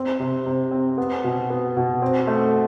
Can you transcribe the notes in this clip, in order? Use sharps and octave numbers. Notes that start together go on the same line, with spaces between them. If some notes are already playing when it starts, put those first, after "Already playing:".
Already playing: C4
C3
C3
C4
B3
B2
B3
B2
C4
A3